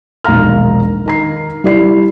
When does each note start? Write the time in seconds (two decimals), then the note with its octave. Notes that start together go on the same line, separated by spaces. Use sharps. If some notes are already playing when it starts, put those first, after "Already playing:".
0.24 E1 A#1 D#3 F5 A#5 F6
1.06 D#3 A#5 C7
1.64 G3 E4 D5 C7